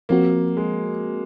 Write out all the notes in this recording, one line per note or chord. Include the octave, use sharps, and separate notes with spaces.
F3 A#3 C4 F#4
G#3